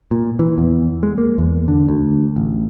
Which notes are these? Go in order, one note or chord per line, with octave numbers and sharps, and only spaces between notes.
A#2
E3
E2
G#3
A#3
E2
D3
D2
A1